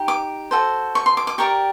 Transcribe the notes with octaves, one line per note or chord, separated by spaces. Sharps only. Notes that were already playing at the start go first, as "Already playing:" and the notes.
Already playing: D#4 G4
D6
F#4 A4 C5
C#6
C6
D6
D6
G4 A#4 D5 C#6